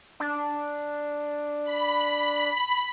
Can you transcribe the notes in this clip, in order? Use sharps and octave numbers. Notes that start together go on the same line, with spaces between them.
D4
B5